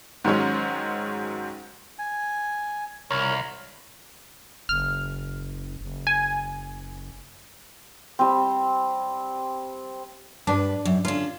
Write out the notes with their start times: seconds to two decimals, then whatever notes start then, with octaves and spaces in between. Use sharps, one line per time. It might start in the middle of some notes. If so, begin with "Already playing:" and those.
0.24 G#2 D#3 F#3 G#3 C#4
1.99 G#5
3.11 C2 A#4 C#5
4.69 F#1 F6
5.81 F#1
6.07 G#5
8.19 G3 C4
10.47 G2 D4 B4
10.85 F#2
11.05 D3 C#4 F4